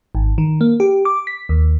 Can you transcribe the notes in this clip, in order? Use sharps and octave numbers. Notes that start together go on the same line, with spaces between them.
G#1
D#3
A#3
G4
D6
B6
D#2